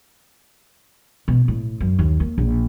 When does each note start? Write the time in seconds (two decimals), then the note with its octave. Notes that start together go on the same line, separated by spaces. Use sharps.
1.28 B2
1.48 A2
1.80 F#2
1.99 D#2
2.20 A#3
2.38 A#1